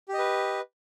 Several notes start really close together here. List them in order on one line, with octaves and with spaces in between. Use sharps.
G4 D#5 B4